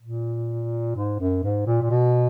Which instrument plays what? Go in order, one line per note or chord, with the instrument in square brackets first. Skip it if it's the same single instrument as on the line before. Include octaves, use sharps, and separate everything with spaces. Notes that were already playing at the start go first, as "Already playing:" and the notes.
[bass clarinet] A#2
G#2
F#2
G#2
A#2
A#2
B2